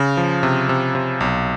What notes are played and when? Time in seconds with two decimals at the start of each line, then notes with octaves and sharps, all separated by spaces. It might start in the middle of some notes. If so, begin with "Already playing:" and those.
Already playing: C#3
0.17 F3
0.43 C3
0.69 C3
0.95 C3
1.20 B1